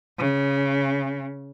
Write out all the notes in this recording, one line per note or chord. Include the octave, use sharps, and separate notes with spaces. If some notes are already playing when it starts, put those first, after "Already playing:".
C#3